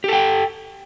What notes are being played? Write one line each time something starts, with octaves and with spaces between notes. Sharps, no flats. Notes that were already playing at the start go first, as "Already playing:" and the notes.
G4 A4 G5